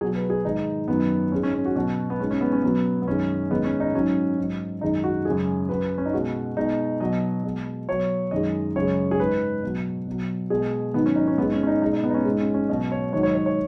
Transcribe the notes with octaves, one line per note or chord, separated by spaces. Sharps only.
B2 F#3 G#4
B4
G#4
G#2 D#3 G#3 D#4
F#2 D#3 F#3 B3
G#2 G#3 C#4
C#4
C#4
F#4
B2 F#3 F#4
B3
G#2 G#3 C#4
C#4
B3
C#4
B2 F#3 B3
B3
F#2 D#3 G#3 C#4
G#2 D#3 G#3 B3
C#4
D#4
G#2 F#3 C#4
G#2 F#3
F#2 D#3 G#3 D#4
F#4
F#2 C#3 G#3 G#4
F#2 F#3 B4
C#4
D#4
B2 G#3 F#4
B2 G#3 D#4
B2 F#3 D#5
B2 G#3
B2 F#3 C#5
F#2 D#3 G#3 D#5
F#2 C#3 G#3 C#5
G#4
G#2 G#3 B4
B2 F#3
B2 F#3
B2 G#3 G#4
G#2 D#3 F#3 B3
C#4
D#4
C#4
G#2 G#3 B3
C#4
C#4
D#4
B2 G#3 D#4
D#4
B3
D#4
C#4
G#2 G#3
C#4
C#4
B2 F#3 D#5
C#5
G#2 D#3 F#3 C#5
C#5
C#5
C#5